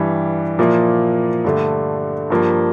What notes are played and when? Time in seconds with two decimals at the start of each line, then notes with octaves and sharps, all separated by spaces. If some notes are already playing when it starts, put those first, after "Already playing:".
Already playing: G2 E3 G3
0.59 A#2 F3 A#3 E4
1.44 G2 D3 A3
2.30 G2 F3 A#3